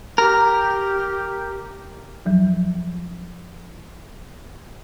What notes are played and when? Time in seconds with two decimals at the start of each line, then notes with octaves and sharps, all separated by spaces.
0.18 G4 A#4
2.25 F2 F3 F#3